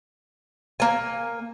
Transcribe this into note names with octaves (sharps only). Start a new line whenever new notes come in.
A#3 G#5